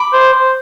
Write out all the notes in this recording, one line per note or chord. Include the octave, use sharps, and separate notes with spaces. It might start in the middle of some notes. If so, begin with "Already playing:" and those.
Already playing: B5 D6
C5
C5